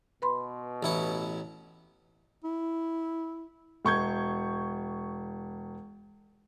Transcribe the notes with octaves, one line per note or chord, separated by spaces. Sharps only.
B2 B4 B5 C6
A1 E4 C#5
E4
E1 C#6 G6 G#6